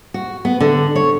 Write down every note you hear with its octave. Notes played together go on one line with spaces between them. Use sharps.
F#4
B3
D3
C#5